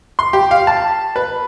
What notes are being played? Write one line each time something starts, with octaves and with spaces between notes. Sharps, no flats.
C6
G4
F5
A5
B4